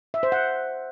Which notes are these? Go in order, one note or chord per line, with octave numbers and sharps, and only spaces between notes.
E5
C5
F#5